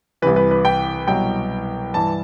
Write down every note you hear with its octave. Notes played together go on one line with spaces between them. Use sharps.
C2 C3 E3 B4
B4
B4
G5
C2 B2 F#3 G5
G2 E3 A5